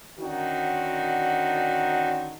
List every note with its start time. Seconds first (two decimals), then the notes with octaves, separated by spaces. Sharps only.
0.18 D3 D#3 C#4 D#4 F#4